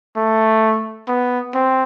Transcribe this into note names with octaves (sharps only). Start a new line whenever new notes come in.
A3
B3
C4